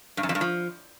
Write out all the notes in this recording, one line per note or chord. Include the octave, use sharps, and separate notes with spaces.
G2
F#2
F2
G2
F3